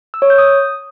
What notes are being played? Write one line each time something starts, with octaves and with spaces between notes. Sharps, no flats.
E6
C#5
G6
D#6